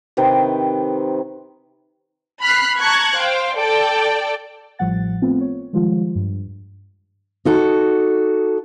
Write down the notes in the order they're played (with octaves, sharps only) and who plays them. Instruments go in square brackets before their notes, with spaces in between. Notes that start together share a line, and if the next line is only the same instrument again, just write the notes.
[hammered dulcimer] C3 D#3 B4 G5
[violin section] B5 F6 F#6 C7
A5 A#5 C#6 F#6 G#6
C5 F5 G5
A4 D5 G5 A5
[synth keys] A1 A2 F3 G3 F#5 A6
A3 B3 C4 F4
C#5
D#3 F3 G3 G#3 F4
G2
[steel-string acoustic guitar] D#4 F#4 A4